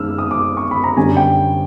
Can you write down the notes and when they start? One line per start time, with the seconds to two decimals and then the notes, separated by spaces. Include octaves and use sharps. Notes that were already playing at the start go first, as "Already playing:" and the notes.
Already playing: F#2 D#3 G#3 E6 F6
0.18 D#6
0.31 D6
0.57 C#6
0.71 B5
0.84 A#5
0.97 F#2 D3 G3 G#5
1.17 G5